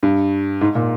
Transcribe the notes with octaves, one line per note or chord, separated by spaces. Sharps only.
G2
G#2
A#2